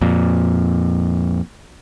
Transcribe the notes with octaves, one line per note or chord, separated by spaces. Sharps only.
F2 A#2